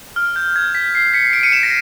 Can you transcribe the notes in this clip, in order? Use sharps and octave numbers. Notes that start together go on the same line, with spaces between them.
F6
G6
G#6
B6
C7
B6 C#7
C7 D7
C#7 D#7
D7 E7
A#6